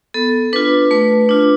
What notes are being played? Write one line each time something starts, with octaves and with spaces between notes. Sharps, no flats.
B3 A4
D4 F4 B4
A3 B4
D4 F4